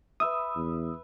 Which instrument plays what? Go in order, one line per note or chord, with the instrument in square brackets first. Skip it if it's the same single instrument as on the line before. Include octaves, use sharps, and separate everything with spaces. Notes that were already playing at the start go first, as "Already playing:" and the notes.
[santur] B4 E5 [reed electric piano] D#6 E6
[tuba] E2